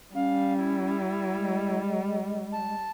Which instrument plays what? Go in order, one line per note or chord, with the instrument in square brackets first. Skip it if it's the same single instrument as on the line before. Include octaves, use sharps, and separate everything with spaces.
[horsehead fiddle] G3 [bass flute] C#4 [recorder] F5
[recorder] E4
[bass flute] G#3
[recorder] A5